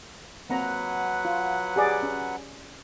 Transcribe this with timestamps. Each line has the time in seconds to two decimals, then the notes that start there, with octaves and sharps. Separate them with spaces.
0.50 F#3 A#3 C4 B4 F#5 A#5
1.25 F4
1.76 G4 G#4 D5
2.03 C#4